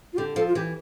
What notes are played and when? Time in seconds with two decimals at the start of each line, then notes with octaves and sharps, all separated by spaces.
0.13 F4
0.17 D3 G4
0.36 F3 A4
0.47 F4
0.55 E3 G4